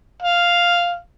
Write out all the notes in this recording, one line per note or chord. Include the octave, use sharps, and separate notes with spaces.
F5